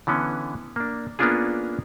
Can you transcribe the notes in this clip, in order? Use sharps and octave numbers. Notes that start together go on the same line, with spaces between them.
D3 E3 B3 C#4
A#3 D4
A#3 B3 C#4 D4 F4 G#4